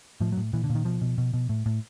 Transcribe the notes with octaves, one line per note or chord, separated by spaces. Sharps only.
A2 F3
F#3
A2
A#2 E3
D3
A#2
D#3
B2 F3
B2
B2
B2
A2
A2